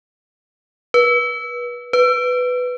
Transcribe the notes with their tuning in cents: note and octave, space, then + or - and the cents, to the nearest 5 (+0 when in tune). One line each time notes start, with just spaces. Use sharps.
B4 -30
B4 +10